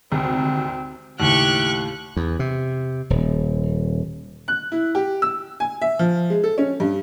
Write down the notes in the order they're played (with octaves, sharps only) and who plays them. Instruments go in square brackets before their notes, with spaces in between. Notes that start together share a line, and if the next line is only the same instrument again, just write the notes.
[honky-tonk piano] G#1 D2 C3 [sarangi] C4
[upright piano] D#2 A2 [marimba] C#3 [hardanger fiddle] G4 C#6 [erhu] F#6
[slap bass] E2
C3
D#1
[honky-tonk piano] F#6
E4
G4
E6
G#5
E5
F3
G#3
A4
C#4
G2